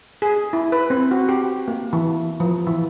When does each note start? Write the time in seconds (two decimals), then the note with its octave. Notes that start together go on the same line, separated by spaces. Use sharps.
0.22 G#4
0.53 E4
0.72 B4
0.90 C4
1.11 F#4
1.29 G4
1.68 A#3
1.93 E3
2.40 F3
2.67 E3